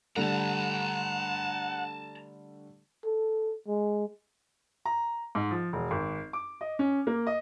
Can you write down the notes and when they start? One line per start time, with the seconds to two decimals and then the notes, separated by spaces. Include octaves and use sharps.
0.16 D3 G3 A3 F#5 A5 A#5
3.05 A4
3.68 G#3
4.85 A#5
5.35 G#2
5.51 F3
5.73 E1
5.91 G#1
6.33 D6
6.61 D#5
6.79 C#4
7.07 A#3
7.27 D#5